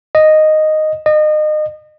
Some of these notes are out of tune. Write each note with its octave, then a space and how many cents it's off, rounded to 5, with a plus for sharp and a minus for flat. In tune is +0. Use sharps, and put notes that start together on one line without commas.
D#5 -5
D#5 -30